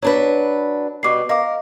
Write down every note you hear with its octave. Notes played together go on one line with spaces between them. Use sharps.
F#3 D4 B4 C#5
B2 G3 C#6 D6 C7
A#4 D#5 F5 D6